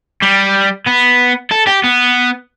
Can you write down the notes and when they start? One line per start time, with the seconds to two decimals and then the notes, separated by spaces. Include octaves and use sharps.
0.22 G3
0.86 B3
1.51 A4
1.67 G4
1.84 B3